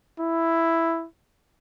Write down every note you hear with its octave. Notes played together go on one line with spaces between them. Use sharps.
E4